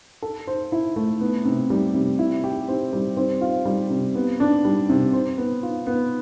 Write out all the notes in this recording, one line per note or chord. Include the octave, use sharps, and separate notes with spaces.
A4
C5
E4
A3
B3
C3
G3
C3
E4
G4
C4
G3
C4
F4
G3
C3
B3
D4
G3
C3
C5
B3
F4
B3